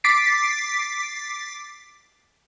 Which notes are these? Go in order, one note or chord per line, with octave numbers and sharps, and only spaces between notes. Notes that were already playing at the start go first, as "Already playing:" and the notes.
D6 A6 B6 C7 D7